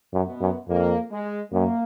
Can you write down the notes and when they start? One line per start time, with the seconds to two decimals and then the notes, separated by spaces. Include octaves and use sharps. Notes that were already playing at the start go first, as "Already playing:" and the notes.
0.13 F#2
0.26 B2 B3
0.41 F#2
0.68 F2 A#3
1.11 G#3
1.52 F#2 A#3